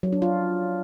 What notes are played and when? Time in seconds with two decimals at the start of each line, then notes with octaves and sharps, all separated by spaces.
0.03 F#3
0.13 D4
0.22 F4